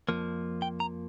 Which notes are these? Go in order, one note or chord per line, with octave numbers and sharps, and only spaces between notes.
F2 F3 A#3
G5
A#5